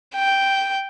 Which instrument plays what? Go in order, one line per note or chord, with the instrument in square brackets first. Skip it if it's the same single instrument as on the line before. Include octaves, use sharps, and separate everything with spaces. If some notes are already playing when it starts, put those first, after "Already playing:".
[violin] G5